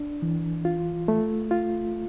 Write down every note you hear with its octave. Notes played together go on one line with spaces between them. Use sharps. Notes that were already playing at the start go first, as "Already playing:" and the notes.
Already playing: D4
E3
F4
A3
F4